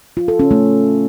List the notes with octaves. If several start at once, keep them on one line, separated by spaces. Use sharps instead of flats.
F4
A4
C#4
A3